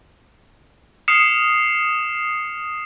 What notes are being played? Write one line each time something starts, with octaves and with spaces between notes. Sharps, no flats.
D#6 F6 C7 C#7 E7